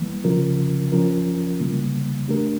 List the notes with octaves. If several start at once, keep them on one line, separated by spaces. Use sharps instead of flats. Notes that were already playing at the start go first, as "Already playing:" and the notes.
Already playing: E3 G3 A#3
C#3 F3 C#4 F4 A#4
F3 C#4 F4 A#4
C#3 E3 G3 A#3
A3 D4 G4 A#4